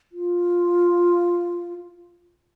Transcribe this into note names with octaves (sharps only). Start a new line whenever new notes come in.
F4